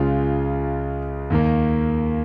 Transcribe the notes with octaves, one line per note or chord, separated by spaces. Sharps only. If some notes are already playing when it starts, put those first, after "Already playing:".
Already playing: C#2 C#3 G#3 F4
D#2 D#3 A#3